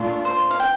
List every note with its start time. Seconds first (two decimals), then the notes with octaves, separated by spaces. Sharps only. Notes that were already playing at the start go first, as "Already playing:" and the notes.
Already playing: A#2 A3 D4 F4
0.25 C5
0.51 F5
0.60 G5